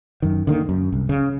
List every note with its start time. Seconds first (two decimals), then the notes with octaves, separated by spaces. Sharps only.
0.22 F#2 D#3
0.47 D3 D#3 A#3
0.69 F#2
0.92 C2
1.09 C#3